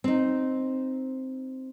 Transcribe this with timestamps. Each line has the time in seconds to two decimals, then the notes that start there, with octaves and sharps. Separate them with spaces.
0.04 C4 D#4